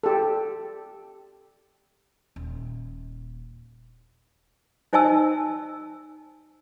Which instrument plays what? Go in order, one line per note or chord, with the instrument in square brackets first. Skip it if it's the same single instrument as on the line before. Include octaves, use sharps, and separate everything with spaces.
[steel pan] G4 A4
[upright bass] D#1
[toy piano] D#4 C5 D#5 G#5 A5 E6